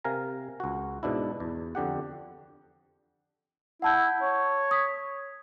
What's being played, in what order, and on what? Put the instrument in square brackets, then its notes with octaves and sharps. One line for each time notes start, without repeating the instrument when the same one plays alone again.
[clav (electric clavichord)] C3 A#4 F5 G#5 A#5
C#2 F#4
G#2 B2 D4 E4
E2
F2 D3 G4 F#5
[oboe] E4 [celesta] F#5 A5 G6
[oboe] C#5
[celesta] D#6 B6